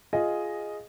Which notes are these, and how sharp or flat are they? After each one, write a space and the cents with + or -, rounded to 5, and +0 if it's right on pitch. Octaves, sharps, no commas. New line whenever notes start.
F4 +0 G#4 +5 D#5 +0